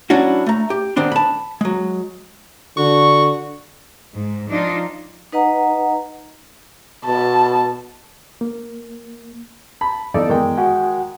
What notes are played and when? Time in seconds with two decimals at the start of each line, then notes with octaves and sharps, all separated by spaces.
0.10 F#3 C#4 D4 E4 F#4
0.46 A3 A#5
0.70 G4
0.96 D#3 B3 C4 D4 C6
1.12 A5 B5
1.61 F#3 G#3
2.77 D3 F#4 C#6
4.14 G#2
4.47 F3 D4 D#4 F4
5.32 D#4 B4 D#5 F#5 A#5
7.05 B2 A5
8.41 A#3
9.81 A5 B5
10.14 F#2 E3 B3 D#4 A4 D5
10.29 D#3 G#3 G5
10.57 F#4 F#5 G#5